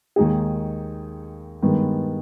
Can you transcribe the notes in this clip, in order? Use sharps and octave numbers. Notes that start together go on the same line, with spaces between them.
D#2 D#3 G#3 D#4 G#4
G2 D#3 G#3 B3